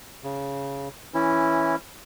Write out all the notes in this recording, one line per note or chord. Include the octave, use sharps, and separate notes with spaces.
C#3
E3 C#4 E4